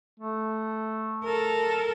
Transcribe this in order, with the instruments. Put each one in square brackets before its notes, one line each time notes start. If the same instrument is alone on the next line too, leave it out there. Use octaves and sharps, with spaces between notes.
[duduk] A3
[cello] A4 A#4